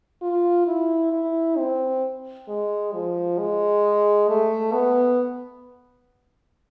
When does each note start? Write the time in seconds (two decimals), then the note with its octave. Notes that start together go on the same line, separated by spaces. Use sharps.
0.22 F4
0.67 E4
1.12 E4
1.58 C4
2.48 G#3
2.93 F3
3.39 G#3
4.29 A3
4.73 B3